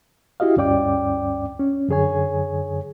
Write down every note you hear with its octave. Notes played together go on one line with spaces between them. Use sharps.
E4 F#4 G4 D#5 F5
D2 G2 C#4 D5 G5 D6
C#4
F#2 D3 G#4 C#5 G#5